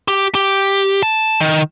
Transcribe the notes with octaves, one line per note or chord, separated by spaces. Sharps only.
G4
G4
A5
D#3